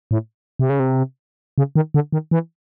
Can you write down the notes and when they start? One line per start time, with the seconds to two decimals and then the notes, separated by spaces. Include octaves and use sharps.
0.11 A2
0.59 C3
0.69 C#3
0.80 C3
1.58 C#3
1.75 D#3
1.94 D3
2.12 D#3
2.31 E3